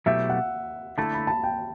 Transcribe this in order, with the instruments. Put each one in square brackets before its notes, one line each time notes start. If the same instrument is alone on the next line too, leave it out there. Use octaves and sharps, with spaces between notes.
[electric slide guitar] B2 F#3 A3 E4 G4 [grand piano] E5
[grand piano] F#5
[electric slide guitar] D3 A3 E4 [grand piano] A5
[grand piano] B5
A5
G5